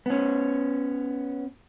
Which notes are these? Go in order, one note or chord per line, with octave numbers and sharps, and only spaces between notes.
B3 C#4